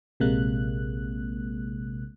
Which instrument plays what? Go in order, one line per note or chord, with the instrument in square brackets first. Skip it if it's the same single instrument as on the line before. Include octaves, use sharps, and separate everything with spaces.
[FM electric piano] A#1 C3 G#3 A#3 F#6